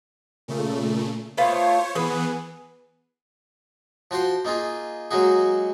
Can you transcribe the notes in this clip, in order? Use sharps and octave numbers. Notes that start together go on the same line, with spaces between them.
A#2 C#3 A3
A3 B3 F4 C5 C#5
E3 B3 G#4 B4
F3 F#4 C5 G5 C6
A#3 D#4 F4 G#4
F#3 G#3 A#3 D#4 F#4 G#4